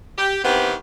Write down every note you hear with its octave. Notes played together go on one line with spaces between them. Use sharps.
G4
D#3 E3 B3 C4 G4